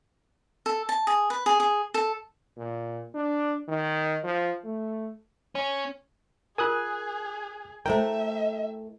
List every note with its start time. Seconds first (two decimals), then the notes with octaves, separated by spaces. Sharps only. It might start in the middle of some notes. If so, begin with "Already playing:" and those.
0.66 A4
0.89 A5
1.07 G#4
1.30 B4
1.46 G#4
1.60 G#4
1.94 A4
2.57 A#2
3.14 D4
3.68 D#3
4.23 F3
4.65 A3
5.55 C#4
6.58 F4 G#4 A#4 G#5 D#6 F#6
7.86 A3 E4 A#4 C5 E5 G5 A#5